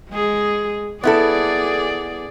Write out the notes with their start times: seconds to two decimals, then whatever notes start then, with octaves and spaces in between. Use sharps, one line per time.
0.11 G#3 G#4
1.04 B3 E4 G#4 A4 D5